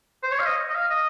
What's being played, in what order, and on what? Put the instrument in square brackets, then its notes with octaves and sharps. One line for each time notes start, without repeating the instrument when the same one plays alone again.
[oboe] C5
C#5
F5
D#5
D#5
F5
D#5